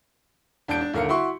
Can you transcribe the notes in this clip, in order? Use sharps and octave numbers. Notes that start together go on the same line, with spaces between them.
E1 D4 A5 G6 D7
D4
D#1 D3 A#4 F5 C#7
E4 F#4 E5 C6 C#6